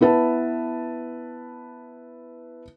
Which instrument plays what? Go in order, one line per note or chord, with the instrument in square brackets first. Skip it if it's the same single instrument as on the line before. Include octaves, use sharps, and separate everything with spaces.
[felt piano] B3 E4 B4 A5